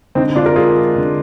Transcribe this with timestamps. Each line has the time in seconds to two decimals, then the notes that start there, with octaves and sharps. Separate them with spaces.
0.15 D3 C4 D#4
0.36 D3 D4 F4
0.46 A#4
0.56 G#3 F4 G#4
0.76 G#3
0.96 D3